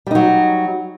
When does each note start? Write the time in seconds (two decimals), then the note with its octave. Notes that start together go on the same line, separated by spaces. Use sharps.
0.07 G3
0.11 D#4
0.15 F#3